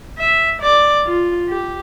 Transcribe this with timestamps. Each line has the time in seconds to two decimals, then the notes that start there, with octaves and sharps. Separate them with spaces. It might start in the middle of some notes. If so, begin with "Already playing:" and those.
0.19 E5
0.61 D5
1.05 F4
1.50 G4